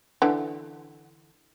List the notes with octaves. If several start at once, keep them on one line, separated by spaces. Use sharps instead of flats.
D3 E3